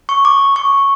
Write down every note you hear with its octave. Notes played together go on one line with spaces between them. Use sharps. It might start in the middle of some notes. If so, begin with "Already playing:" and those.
C#6
D6
C#6